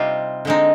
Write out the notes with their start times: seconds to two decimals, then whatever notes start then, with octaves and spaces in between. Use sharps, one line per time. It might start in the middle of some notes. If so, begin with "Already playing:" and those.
Already playing: C3 G3 C4 D#4 F4
0.45 D3 G#3 C4 D#4